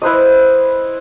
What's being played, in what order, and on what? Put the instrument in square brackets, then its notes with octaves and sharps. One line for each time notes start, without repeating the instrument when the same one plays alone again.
[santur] E4 B4 C5 D#5